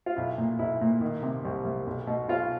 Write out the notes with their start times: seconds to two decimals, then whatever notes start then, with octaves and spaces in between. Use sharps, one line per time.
0.06 F4
0.16 B1 E4
0.38 A#2
0.59 B1 E4
0.81 A#2
1.01 D#3
1.23 C3
1.45 C2
1.65 C2
1.87 B1
2.07 B2
2.28 B1 F4